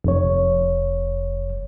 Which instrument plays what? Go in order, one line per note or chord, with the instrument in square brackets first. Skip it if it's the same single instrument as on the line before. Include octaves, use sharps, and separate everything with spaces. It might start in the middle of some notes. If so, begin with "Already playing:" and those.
[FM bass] F1 [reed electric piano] F2 C#5